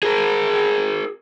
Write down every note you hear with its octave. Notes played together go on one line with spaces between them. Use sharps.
G#4 A#4